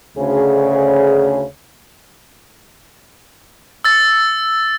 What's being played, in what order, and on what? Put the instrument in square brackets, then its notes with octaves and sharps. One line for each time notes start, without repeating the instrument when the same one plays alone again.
[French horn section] D2 C#3 G#4
[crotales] E6 A6